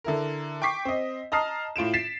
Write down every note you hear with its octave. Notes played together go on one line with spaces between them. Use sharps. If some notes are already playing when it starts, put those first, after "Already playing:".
D3 E4 A#4
G5 C#6 D6 B6 C7
C4 D#5
D#5 A5 A#5 D#6 F6 C7
A2 F4 D7 E7
A6 B6 C7 E7